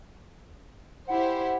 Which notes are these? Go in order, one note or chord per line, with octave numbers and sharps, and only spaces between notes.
E4 G4 C5 F#5